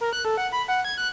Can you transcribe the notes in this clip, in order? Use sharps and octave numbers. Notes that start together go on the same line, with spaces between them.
A#4
F#6
A4
F#5
B5
F#5
G#6
F#6